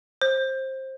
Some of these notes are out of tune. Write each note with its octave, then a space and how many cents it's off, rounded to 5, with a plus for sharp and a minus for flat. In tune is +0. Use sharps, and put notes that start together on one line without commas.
C5 +20